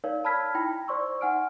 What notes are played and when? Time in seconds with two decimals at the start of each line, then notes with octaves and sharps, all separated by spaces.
0.04 D#4 A#4 C#5 D5 F5
0.24 A5 B5 E6 F6 G#6 B6
0.54 D#4 E4 G5 B5 A#6
0.88 C5 D5 C6 C#6 E6
1.21 D#4 F#5 G#5 F6 D7